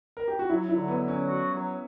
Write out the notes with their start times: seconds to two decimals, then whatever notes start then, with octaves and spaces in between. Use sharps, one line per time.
0.17 A#4
0.28 G4
0.39 F#4
0.49 F#3 E4
0.69 E4
0.76 D3
0.88 B3
1.01 F#3
1.08 C#4
1.27 F#4
1.53 F#3